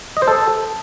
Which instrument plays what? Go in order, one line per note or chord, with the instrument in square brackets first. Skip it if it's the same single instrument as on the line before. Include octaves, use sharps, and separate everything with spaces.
[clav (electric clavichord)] D#5
C5
A4